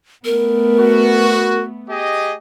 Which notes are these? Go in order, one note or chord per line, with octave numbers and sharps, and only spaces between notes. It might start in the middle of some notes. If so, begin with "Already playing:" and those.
A3 B3 A#4
F#4
G4 G#4 D#5